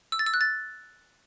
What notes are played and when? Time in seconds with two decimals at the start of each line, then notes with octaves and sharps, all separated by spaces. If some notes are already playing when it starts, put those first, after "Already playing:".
0.12 E6
0.19 A6
0.26 E6
0.34 F#6
0.41 A6